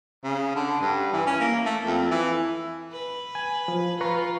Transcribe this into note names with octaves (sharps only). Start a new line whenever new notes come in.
C#3
D3
G2
E3
C#4
A#3
A3
F2
E3
B4
G#5
F3
F4 B4 A#5 C#6